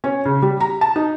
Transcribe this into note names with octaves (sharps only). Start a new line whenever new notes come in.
C#4
C#3
G3
A#5
A5
D#4